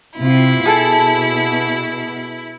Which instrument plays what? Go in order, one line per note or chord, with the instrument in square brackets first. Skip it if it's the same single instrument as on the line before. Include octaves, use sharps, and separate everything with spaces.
[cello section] C3 F4 [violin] E4
[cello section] B2 [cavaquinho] G#4 A4 A5